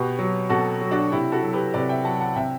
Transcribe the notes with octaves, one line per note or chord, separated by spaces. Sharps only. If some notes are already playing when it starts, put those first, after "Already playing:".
Already playing: B2 G4 B4
F#3
B2 F#4 A4
F#3
D4 F#4
C3 E4 G4
F#4 A4
F#3
G4 B4
C3 B4 D5
E5 G5
F#3 F#5 A5
F#5 A5
C3 E5 G5